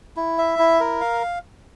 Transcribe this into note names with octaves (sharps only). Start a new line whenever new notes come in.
E4
E5
E4
A#4
F5